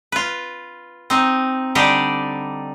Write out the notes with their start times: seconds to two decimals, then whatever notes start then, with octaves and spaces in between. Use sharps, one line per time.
0.12 F4 B4
1.10 C4 D#4
1.75 D3 G3 D#4 G4 D5